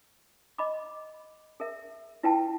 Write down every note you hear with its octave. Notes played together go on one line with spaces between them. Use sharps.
D#5 B5 D6
G#4 A#4 E5
E4 F4 B4 F#5 G5 A5